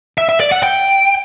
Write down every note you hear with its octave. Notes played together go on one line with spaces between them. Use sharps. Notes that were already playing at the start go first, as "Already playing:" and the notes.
E5
E5
D5
F#5
G5